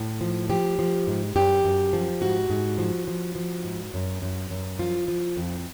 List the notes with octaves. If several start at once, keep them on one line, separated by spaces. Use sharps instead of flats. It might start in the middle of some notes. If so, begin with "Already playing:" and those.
Already playing: A2
F3
F3 G4
F3
G#2
F#2 G4
F#2
F3
G#2 F#4
G#2
F3
F3
F3
G#2
F#2
F#2
F#2
F3 F4
F3
F2